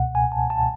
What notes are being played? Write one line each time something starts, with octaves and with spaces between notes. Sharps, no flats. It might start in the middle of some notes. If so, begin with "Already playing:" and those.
Already playing: C#2 B2 F#5
G#5
A5
A5